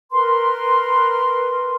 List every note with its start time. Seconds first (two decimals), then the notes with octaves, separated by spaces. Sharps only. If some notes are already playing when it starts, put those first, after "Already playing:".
0.12 A#4 B4 C6